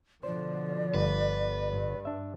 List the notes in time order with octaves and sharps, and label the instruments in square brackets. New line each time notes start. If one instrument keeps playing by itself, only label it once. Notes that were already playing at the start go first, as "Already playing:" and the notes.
[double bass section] B2 D3 F3 [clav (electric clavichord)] C5 [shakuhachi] D5
[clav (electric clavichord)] G1 [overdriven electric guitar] B4
[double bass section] G2
[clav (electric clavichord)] D4 E5